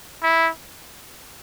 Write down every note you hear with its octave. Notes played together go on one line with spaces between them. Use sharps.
E4